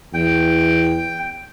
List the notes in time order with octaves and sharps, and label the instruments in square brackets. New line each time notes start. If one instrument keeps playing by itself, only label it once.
[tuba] E2 [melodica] G5